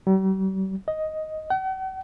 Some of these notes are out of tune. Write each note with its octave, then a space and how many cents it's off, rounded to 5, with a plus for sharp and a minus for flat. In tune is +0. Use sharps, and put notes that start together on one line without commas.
G3 -45
D#5 +5
F#5 +45